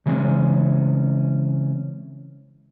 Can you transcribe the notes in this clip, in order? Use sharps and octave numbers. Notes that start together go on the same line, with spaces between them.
C#3 E3 G3 G#3 C4 C#4